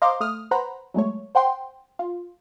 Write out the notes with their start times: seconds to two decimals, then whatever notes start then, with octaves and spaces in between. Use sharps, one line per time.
0.02 C5 D#5 F5 A#5 C6 D6
0.20 A3 D#6 F6
0.51 B4 C5 F#5 A#5 B5
0.94 F#3 G#3 A3 C#5
1.35 C5 F#5 G5 C6
1.99 F4